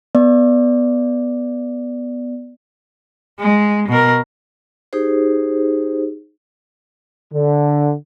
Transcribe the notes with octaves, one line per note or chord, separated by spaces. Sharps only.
B3 D5
G#3
B2 A#4
D#4 G4 G#4 C5
D3